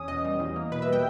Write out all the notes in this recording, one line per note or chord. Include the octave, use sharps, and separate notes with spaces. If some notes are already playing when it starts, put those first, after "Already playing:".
Already playing: E2 C#4 D#6
B2 D#5
G3
E2
A#3
B2 B4
E5
G3 G5